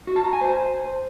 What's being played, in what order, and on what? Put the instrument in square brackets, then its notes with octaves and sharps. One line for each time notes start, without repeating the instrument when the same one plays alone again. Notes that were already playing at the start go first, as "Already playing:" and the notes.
[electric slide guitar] F#4
A5
A#5
G#5
C5